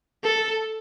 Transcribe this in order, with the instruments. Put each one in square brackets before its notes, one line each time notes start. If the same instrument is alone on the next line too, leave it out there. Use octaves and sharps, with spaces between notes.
[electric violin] A4